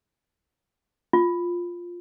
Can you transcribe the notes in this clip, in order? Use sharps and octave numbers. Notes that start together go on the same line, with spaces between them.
F4